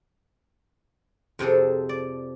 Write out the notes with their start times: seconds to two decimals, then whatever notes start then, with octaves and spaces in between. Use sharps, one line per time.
1.39 F2 C3 G#4 A4
1.89 D5